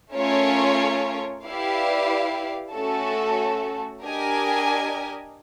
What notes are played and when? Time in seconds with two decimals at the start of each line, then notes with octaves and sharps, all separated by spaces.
0.14 A3 C#4 F4 A#4 C#5
1.44 E4 G4 B4 D5 F5
2.73 A3 C#4 F#4 A4
4.03 D4 G4 A#4 D#5 G#5